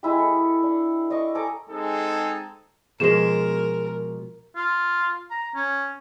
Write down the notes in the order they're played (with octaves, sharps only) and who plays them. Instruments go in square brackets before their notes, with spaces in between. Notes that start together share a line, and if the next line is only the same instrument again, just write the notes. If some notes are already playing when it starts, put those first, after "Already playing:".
[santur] G#3 E4 G4
A4
D4
D5 D#5 F5 C#6
A4 G#5 A#5 D6
[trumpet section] G#3 C4 D#4 G#4 A4
[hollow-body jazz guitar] B2 F3 G#3 [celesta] G#4 E7 [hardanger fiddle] A#4
[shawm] F4
A#5
C#4